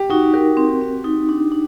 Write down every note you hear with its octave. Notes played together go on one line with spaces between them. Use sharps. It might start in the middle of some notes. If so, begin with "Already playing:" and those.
Already playing: G4
D#4 F#4
G4 A#4
C4
C4
D#4
D4
D4